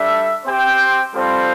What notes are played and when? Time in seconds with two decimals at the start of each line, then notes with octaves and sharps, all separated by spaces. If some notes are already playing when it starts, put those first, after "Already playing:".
Already playing: G3 D4 A4 E5
0.46 C4 G4 C5 G5
1.14 G3 C4 F4 A4 C5